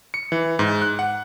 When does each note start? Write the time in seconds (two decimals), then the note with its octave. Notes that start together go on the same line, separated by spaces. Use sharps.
0.14 C#7
0.32 E3
0.59 G#2
0.82 F#6
0.99 F#5